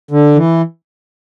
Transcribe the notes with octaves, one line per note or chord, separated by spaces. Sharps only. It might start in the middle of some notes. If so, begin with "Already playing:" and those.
D3
E3